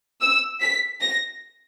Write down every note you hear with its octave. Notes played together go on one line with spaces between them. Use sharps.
E6
B6
A#6